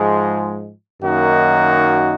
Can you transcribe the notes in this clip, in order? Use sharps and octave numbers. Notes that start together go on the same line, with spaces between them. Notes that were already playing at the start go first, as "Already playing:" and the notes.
Already playing: G#2 F3 G#3
F#2 D#3 A#3 D#4 F#4